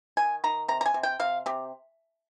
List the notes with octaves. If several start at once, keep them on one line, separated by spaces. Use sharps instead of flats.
D#3 G#5
D#3 A#5
C3 A#5
A#5
G#5
C3
G5
C3 F5
C3 G4